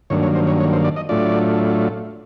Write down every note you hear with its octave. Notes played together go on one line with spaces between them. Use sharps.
G2 D#3 F#3 A#3 D4 C#5
C#5
C5
C#5
C#5
C5
D5
D#5
A2 F#3 A3 D4 F4 D5